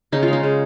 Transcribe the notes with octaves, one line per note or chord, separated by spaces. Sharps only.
C#3 D#4
F4
G#3 D#4
C#3